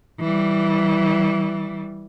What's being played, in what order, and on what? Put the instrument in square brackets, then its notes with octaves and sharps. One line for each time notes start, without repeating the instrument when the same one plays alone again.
[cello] E3 G3